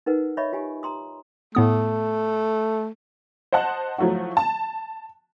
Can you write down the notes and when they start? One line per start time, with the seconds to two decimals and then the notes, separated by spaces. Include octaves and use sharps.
0.06 D#4 A#4 B4 F#5
0.37 C#5 D#5 E5 B5 C#6
0.53 F4 G4 G#5
0.83 A#5 C6 D#6
1.55 A2 A3 B3 D#6
3.53 C5 D#5 F#5 A5 F#6
3.98 F3 F#3 A3 E4 F#4
4.37 A5